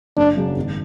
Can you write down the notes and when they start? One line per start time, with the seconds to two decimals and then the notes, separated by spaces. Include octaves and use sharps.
0.17 F#1 D4
0.36 F#2 C#3 F#3
0.57 G#1